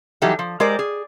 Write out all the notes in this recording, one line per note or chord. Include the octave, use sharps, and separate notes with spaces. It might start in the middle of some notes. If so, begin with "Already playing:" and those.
E3 F#3 G3 D#4 G4 A4
F3
G#3 G4 A#4 C5 D5
G#4